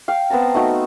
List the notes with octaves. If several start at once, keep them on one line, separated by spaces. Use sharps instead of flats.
F5 G5
B3 C4 A5 A#5
A3 D#4 F#4